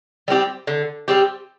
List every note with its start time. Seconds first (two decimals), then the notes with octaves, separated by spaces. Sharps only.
0.28 G3 C4 G4
0.67 D3
1.08 G3 C4 G4